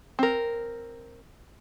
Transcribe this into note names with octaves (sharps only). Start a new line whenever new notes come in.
C4 A#4